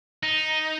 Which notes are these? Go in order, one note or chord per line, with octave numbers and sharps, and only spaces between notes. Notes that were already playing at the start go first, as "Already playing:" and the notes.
D#4